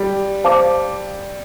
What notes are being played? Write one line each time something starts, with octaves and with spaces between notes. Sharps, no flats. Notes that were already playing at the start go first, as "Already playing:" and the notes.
Already playing: G3
C5 F5 A5 D6